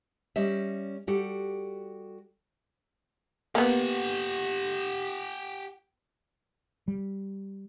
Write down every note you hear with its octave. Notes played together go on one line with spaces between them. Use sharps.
G3 C#4 D#5 E5
G3 F#4 G4 A4
A#3 B3 G4 F#5
G3